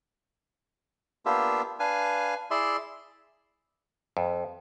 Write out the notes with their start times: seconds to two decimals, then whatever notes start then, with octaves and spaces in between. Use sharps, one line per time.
1.26 A#3 B3 D4 F4 G4 E5
1.80 D4 B4 F5 G#5
2.51 E4 G#4 D5 E5 C6
4.17 F2